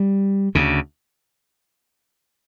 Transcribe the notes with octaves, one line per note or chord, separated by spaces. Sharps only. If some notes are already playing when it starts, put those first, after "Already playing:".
Already playing: G3
D2 C#3